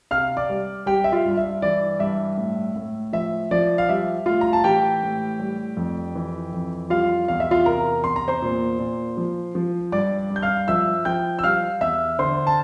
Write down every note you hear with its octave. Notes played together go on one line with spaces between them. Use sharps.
C3 F5 F6
D5 D6
G3
G3 G4 G5
E5
F4 F5
G2
E5
E3 D5
G2 E5
A2
A2
F3 E5
F3 D5
F5
G3 E5
A2 F4 F5
A#5
A5
E3 G4 G5
A2
G3
F2
E3
F2
G3 F4 F5
E2 F5
E5
F4 F5
C3 A#4 A#5
E2 C6
A#5
C5 C6
A#2
A#2
F3
F3
G2 D5 D6
G2
G6
F5 F6
F3 E5 E6
F3 G5 G6
E6
G3 F5 F6
E2 E5 E6
D3 C5 C6
A5